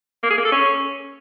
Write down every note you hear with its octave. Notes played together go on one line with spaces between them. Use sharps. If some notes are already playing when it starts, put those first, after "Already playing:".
A#3
G#4
A#3
A4
C#4